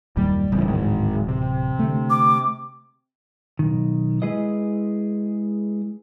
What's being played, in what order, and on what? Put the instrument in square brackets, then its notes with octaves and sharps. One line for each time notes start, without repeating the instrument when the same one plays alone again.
[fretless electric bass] F#1 D#2 A#2 [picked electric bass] G3
[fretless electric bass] D1 E3 [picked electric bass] C#3 G3
[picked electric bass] G#2 D#3 G#3
C3
[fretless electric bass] D3 A3
[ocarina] D6
[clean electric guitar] B1 G2 D#3
G#3 E4 G#4 B4 D#5